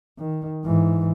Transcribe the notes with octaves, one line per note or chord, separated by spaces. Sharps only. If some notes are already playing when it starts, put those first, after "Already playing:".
D#3
G#2 E3